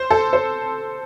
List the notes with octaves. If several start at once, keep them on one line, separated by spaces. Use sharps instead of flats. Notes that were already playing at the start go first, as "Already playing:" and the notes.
Already playing: C5
A4
C5